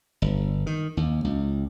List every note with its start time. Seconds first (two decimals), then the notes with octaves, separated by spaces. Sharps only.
0.22 G1
0.66 D#3
0.97 D#2
1.25 C#2